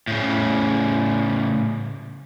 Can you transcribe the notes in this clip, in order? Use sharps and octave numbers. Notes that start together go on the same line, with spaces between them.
A2 C#3